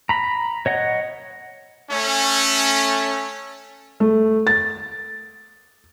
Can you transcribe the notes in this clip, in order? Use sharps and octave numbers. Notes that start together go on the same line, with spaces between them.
A#5 B5
C#5 D#5 F#5
A3 C#4
A3
A6